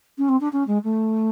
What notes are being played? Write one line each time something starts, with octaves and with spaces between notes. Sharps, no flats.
C#4
C4
D4
C#4
G#3
A3